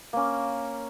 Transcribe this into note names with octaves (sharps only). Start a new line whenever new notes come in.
A#3 C#4